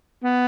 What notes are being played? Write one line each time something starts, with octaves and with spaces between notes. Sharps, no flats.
B3